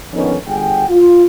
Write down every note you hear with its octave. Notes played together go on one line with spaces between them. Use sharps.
F2 D3 D#3 B3 C#4 D#4
G1 G#4 F#5 G5
F4